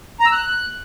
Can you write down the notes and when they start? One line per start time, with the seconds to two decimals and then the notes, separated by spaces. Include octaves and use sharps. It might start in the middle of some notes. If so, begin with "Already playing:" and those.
0.20 A#5
0.26 E6
0.32 F#6